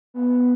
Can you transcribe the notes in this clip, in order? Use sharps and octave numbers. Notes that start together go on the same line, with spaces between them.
B3